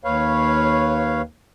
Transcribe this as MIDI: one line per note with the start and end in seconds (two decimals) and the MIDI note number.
0.04 1.22 39
0.04 1.22 71
0.04 1.22 73
0.04 1.22 77